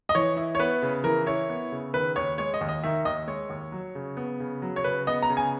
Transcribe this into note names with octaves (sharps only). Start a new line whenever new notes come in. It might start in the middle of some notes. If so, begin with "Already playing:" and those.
D#5
E3 C#5
E4
C#5
B3 B4
C#3
E3 A#4
E4 C#5
B3
C#3
D#3 B4
D#2 C#5
G#3 C#5
D#5
D#2
D#5
D#3 E5
D#2 D#5
G#3 C#5
D#2
F#3
C#3
B3
C#3
F#3
C#5
C#3 B4
B3 D#5
A#5
C#3
G#5